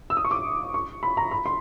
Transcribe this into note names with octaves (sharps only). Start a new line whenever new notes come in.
E6
D#6
C#6
D6
C#6
B5
A#5
B5
C6